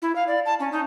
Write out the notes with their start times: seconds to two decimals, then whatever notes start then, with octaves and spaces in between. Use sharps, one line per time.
0.02 E4
0.15 F5
0.27 D5
0.46 A5
0.60 C#4
0.72 D#4